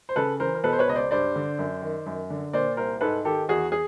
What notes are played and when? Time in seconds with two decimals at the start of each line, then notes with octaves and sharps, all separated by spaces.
0.09 C5
0.16 C#3 A4 B4
0.40 E3 A#4 C5
0.55 A#4
0.64 B2 A4 B4
0.73 C5
0.79 B4 C#5
0.87 C#2 D#5
0.95 C5 D5
1.11 G2 C5 D5
1.36 D3
1.59 F#2
1.82 D#3
2.06 F#2
2.30 D3
2.53 A#2 C5 D5
2.77 C2 A#4 C5
3.01 G#2 A4 B4
3.25 D#3 G4 A4
3.49 E2 F#4 G#4
3.72 G#4